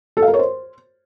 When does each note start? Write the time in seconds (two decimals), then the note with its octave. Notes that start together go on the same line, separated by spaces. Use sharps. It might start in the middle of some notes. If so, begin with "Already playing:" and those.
0.17 A4
0.22 F5
0.28 A#4
0.34 C#5
0.39 C5